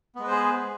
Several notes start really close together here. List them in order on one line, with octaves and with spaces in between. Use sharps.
B3 G#3 B4 C5 G#4